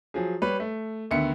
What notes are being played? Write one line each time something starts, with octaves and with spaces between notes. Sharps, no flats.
F3 F#3 G#4
G3 B4 C#5
A3
D2 D#3 B3 E5 C#7